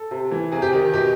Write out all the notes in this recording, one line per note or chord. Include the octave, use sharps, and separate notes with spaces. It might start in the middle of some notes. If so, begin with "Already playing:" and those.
Already playing: A4
C3
E3
C3 G#4
G4
D#3 G4
B2 G4